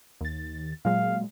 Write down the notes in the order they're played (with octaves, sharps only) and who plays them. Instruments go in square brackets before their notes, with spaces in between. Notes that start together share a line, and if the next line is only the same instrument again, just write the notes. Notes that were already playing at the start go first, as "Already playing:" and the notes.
[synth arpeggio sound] D#2 A6
[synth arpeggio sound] A#2 F#3 G#3 [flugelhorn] F5